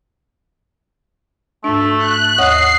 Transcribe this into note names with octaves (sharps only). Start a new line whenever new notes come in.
G#2 A3 D4
F#6
D#2 C#5 D#5 F#5 C7